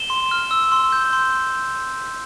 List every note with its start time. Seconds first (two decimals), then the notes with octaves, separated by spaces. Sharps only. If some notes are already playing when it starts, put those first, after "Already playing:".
Already playing: E7 G7
0.10 C6
0.31 F6
0.51 E6
0.72 C6
0.93 G6
1.13 C6